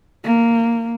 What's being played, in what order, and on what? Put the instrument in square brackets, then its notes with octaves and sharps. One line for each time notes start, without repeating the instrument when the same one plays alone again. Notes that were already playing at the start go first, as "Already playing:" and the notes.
[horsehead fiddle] A#3